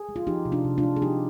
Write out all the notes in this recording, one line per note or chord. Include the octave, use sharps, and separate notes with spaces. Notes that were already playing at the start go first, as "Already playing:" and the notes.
Already playing: G#4
G#3
F4
F3 D#4 G4
C3
D4 F4
C3
D4 F4
G#3
G#4
F3 D#4 G4